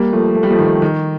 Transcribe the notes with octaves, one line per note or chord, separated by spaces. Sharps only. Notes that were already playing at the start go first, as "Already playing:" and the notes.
Already playing: G3 A#3
F3 A3
A3
G3
F3 A3
D#3
D#3